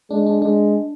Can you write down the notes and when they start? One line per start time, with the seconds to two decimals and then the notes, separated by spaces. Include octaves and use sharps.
0.11 G#3 D4
0.26 D4
0.42 G#3 D4